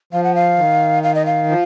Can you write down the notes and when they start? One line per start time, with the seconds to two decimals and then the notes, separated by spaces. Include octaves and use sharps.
0.13 F3 F5
0.24 F#5
0.35 F5
0.58 D#3
1.03 F5
1.15 D#5
1.26 F5
1.49 F3